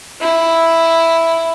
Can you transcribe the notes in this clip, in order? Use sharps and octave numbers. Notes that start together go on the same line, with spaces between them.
E4